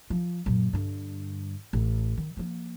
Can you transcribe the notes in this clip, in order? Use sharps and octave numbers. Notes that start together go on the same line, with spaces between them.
F3
F#2 A#2
G2 D3
A1
D#3
F3 A#3